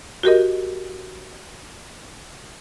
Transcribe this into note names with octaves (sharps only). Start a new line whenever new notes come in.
F#4 G4 A#4 D#5